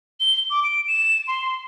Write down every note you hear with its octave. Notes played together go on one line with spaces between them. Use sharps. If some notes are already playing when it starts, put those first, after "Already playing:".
G7
D6
D7
E7
C6
C6